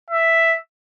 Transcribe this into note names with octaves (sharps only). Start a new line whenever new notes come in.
E5